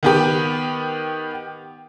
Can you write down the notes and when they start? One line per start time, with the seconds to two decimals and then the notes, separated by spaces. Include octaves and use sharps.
0.03 D#3 B3 G4